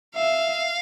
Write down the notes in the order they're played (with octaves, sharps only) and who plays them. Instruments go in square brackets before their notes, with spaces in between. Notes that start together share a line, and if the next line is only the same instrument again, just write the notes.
[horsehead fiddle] E5 [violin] F5